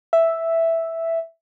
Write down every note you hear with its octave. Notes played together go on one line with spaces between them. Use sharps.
E5